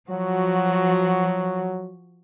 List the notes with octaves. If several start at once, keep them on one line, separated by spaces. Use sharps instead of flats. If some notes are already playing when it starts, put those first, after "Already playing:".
F3 F#3 F#4